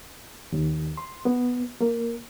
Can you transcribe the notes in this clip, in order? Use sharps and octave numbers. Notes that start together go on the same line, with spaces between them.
D#2
C6
B3
A#3